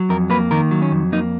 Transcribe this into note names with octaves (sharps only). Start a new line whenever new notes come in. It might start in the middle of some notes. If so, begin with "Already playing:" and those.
Already playing: F#3
F2 A#4
A#3 B4
D#3 A#4
F#3
C#4
F2
A#3 D#4